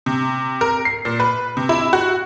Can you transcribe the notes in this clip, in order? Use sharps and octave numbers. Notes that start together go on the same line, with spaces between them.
C3
A#4
C7
A#2
B4
C3
E4
F#4